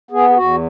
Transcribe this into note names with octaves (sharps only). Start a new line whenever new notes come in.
B3 G#4
G#4
E2 F#4